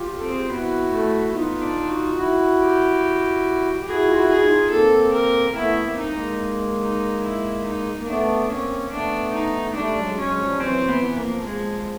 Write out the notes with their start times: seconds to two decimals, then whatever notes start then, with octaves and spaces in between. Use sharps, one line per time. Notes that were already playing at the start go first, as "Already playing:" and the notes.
Already playing: F4 G4
0.16 C4 A4
0.27 G#4
0.38 G4
0.49 B3 E4 F#4
0.91 A3
1.26 E4
1.33 B3 D#4 F4
1.61 D4
1.89 F#4
2.17 E4 F#4
2.60 G4
3.80 G4
3.87 E4 F#4 G#4
4.08 F4
4.15 E4 F#4
4.29 G#4
4.38 E4
4.43 D#4 F4
4.70 A#3 C4 A4
5.13 A#4
5.55 A3 B3 E4
5.83 A#3 C4
5.97 D#4
6.11 G#3 A#3
6.82 D#4
7.24 E4
7.65 D#4
7.97 A#3
8.07 A3 B3 D4
8.49 A#3 C4 C#4
8.91 A3 B3 D4
9.34 D#4
9.70 G#3
9.76 G3 A3 D4
9.97 F#3 G#3
10.19 F#3 G#3 C#4
10.39 F3 G3
10.60 E3 F#3 C4
10.81 E3
10.88 B3
10.94 F3
11.02 E3
11.16 A#3
11.24 F3
11.44 F3 G#3